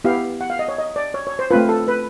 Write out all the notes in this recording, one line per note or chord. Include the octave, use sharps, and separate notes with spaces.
B3 E4 G4 F5
F#5
F5
D#5
C#5
D#5
D5
C#5
C#5
C5
A3 C4 F4 B4
A4
B4